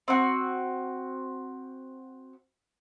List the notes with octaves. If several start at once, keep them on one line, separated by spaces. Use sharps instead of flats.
C4 F#4